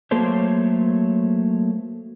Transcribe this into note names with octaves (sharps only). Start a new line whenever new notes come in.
F#3 A3 A#3 A4 C5 C#5